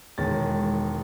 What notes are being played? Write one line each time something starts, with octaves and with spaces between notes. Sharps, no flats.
E1 D#3 G#3 C#5 A6